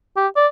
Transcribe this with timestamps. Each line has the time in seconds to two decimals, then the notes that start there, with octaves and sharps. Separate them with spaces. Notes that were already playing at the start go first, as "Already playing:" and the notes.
0.16 G4
0.36 D5